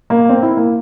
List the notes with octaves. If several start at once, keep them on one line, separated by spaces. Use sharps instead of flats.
A#3
C4
E4
A#3